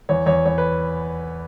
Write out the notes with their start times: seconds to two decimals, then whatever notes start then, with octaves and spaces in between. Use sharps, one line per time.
0.09 E2 C#5
0.26 E2 C#5
0.45 E2 C#5
0.58 B4